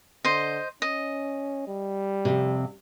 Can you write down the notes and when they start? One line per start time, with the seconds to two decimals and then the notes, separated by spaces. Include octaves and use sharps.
0.25 D3 C5 D#5
0.82 C#4 D#5
1.68 G3
2.25 F2 C3